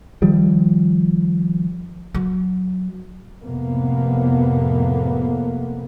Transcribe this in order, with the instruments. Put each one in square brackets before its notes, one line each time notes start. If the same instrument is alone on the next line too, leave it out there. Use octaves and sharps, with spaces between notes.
[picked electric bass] D#3 F3 G3
[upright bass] F#3
[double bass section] F2 A2 C3 A#3 B3